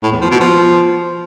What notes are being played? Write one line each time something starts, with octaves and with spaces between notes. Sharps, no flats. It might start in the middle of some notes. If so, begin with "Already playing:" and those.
A2
E2
F3
B2
F3